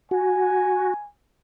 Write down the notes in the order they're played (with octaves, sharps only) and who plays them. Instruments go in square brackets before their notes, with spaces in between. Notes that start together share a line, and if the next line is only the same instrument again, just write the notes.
[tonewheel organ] F#4 [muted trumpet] G#5